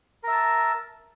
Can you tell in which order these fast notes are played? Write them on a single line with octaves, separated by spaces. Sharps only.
A#4 E5 A5